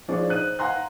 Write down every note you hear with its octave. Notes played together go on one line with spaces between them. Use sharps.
F3 D4 D#4 G#4 C#5 D5
D#4 C5 F#6 D#7
F5 F#5 G#5 A#5 C6 F#6